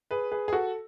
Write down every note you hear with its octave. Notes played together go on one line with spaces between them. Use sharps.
G#4 B4
G#4 B4
G#4
F#4 A4